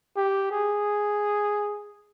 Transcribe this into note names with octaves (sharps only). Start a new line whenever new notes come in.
G4
G#4